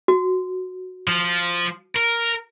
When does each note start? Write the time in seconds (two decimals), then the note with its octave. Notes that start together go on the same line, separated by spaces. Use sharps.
0.08 F#4
1.07 F3
1.96 A#4